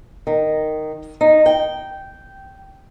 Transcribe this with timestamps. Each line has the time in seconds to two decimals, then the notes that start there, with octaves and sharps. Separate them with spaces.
0.27 D#3
1.21 D#4
1.46 G5